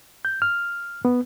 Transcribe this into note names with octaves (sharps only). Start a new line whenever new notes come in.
G6
F6
B3